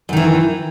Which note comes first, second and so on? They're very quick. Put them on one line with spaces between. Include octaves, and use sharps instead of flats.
F#2 D#3 E3